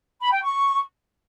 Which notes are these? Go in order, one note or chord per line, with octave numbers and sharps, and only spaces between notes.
B5
G5
C#6